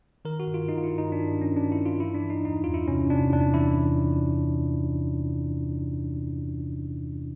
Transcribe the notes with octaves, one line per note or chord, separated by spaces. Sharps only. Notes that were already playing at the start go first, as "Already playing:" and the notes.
D#3 A#4
F#4
G2
F4
D#3 D#4
F4
E4
G2
D#4
G2 D4
D4
D#3
C#4
G2 D4
E4
G2
F4
E3 E4
D4
E3
D#4
E2 D#4
E2 F4
E4
C3 C#4
C3 D4
E2 D4
E3 E4